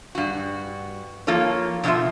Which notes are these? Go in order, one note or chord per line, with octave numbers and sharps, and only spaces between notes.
G2 F#4
F3 A#3 F4 A4 C#5
B2 D3 F3 F4 E5